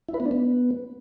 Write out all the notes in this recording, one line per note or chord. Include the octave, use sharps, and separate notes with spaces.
E4
B4
B3
D4
B3